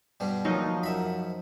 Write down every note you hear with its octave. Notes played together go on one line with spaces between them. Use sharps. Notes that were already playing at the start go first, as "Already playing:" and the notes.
G2 B2 G3
D#2 F3 F#3 D#4
F#2 E5 B5